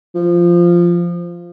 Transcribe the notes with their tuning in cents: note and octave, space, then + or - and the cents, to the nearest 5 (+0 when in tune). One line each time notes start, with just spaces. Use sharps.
F3 -10